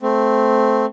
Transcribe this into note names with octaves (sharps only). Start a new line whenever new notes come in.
A3 C4